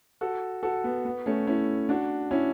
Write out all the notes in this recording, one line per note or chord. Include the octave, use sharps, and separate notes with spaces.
F#4 A4
F#4 A4
B3
B3
A3 C#4
C#4 E4
D4 F#4
C#4 E4